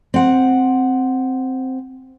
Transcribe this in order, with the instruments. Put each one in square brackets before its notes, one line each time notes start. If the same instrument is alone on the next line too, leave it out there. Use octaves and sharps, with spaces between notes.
[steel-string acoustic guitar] C4 F#5